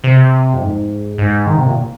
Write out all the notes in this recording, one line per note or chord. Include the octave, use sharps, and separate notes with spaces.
C3
F2
G#2
G#2
D#3
C3
A#2